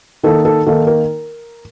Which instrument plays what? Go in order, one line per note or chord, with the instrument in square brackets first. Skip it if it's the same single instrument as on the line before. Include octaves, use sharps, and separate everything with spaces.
[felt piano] D#3 A#3 D#4 A4
A4
D#3 A#3 D#4 A4
A#4